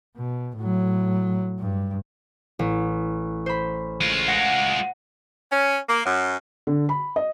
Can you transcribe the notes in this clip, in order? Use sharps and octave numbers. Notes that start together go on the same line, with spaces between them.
B2
A2 F#3
G2
A1
C5 B5
G#3 F4
F#5 A#6
C#4
A#3
F#2
D3
B5
D#5